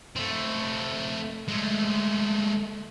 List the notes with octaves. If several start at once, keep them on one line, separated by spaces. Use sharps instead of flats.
A3 C4
G#3 A3